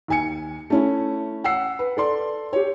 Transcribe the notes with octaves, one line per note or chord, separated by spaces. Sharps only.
D#2 G#5 C#7
A3 C#4 E4
F#5 E6 C7
B4
A4 D5 C6
G4 C#5